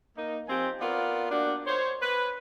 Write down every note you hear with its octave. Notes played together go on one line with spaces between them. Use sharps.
A#3 D#4
F3 C4 G4 G#5
B3 F4 A#4 D5
A#3 D4 F#4 G4
C5 C#5
B4